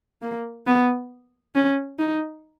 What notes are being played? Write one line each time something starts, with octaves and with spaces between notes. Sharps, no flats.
A#3
B3
C#4
D#4